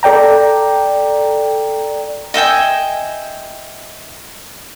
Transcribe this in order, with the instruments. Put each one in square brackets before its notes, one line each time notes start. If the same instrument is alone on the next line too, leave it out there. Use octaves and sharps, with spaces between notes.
[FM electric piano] A4 D5 G5 A#5
[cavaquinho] D#5 E5 G5 G#5